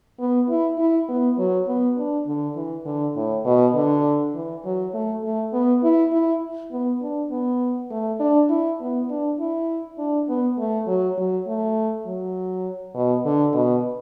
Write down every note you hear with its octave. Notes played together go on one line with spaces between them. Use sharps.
B3
E4
E4
B3
F#3
B3
D4
D3
E3
D3
A2
B2
D3
E3
F#3
A3
A3
B3
E4
E4
B3
D4
B3
A3
D4
E4
B3
D4
E4
D4
B3
A3
F#3
F#3
A3
F#3
B2
D3
B2